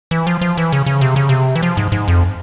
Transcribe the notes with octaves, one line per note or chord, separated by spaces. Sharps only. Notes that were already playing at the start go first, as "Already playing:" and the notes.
E3
F3
F3
E3
C#3
C#3
C3
C#3
C3
E3
F3
G#2
G#2
F2